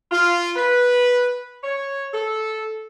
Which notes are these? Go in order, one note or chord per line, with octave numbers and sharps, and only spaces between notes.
F4
B4
C#5
A4